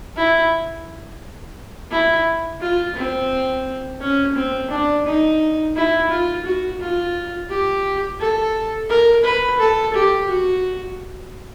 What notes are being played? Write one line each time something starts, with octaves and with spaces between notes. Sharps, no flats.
E4
E4
F4
C4
C#4
C4
D4
D#4
E4
F4
F#4
F4
G4
A4
A#4
B4
A4
G4
F#4